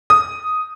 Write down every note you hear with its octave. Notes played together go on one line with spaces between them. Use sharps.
D#6